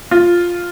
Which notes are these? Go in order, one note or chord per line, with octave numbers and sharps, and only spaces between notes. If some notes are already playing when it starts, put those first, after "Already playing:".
F4